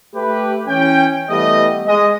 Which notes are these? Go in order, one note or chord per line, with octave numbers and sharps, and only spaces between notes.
A3 G4 B4
E3 C#4 G5
E3 G3 A3 B3 G4 D#5
G#3 D#5